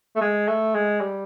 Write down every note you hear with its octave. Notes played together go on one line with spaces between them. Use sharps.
A3
G#3
A3
G#3
G3